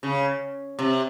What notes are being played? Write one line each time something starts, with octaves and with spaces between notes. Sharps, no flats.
C#3
C3